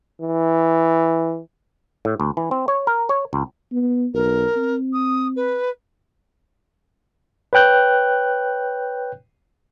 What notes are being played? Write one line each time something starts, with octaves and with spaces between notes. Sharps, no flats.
E3
A2
D2
E3
C4
C#5
A#4
C#5
C#2
B3
B1 A#4
C4
D#6
B4
B4 C#5 G5 F#6 G6